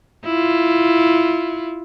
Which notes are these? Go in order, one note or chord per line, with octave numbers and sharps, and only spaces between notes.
E4 F4